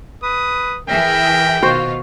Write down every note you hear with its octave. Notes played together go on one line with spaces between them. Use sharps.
B4 D#6
E3 G#4 A#4 E5 G5
B2 D#3 F4 F#4 C5